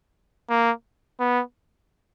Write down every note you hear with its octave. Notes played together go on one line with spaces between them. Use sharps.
A#3
B3